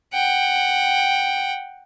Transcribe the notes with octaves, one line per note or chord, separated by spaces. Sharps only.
F#5 G5